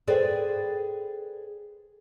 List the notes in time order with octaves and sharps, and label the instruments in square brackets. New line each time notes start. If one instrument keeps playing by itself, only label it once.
[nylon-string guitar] G#4 A4 B4 C5 D5 G5